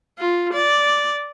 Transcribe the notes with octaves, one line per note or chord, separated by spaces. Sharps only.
F4
D5